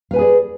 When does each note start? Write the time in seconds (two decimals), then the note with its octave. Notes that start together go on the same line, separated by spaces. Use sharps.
0.11 F5
0.13 B4
0.16 G#5
0.19 G#4
0.21 D5